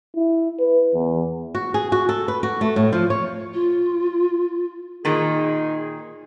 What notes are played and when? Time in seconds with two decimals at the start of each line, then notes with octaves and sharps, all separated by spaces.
0.16 E4
0.59 B4
0.94 E2
1.55 F#4
1.74 G#4
1.92 F#4
2.09 A4
2.28 B4
2.43 F#4
2.61 A3
2.76 A2
2.92 F3
3.10 C#5
3.53 F4
5.05 A#2 D#3 D#4 G#4